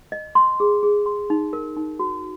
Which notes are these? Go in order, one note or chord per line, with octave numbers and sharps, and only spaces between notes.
D#5
C6
G#4
G#4
C6
D#4
A#4
D#4
F#4